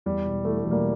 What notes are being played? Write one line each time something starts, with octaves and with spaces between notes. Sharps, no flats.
E2 G3
E1
E3 A3
A3
E1
G3 A#3